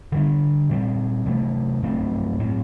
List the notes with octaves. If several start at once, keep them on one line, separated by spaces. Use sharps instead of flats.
D3 G3 D4
A#2 G3 C4
C3 F#3 A3
G2 F#3 A3 C4
A2 F#3 C4